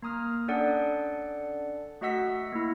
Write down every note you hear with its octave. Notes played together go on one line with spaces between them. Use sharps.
A#3 A#5 D#6 F6
C#4 D4 A4 D5 F#5
A3 F#4 D#5 F#5 E6 B6
A#3 E4